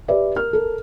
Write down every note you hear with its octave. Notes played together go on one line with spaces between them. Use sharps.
G4 B4 D5 E5
A#4 F6
A4 A#4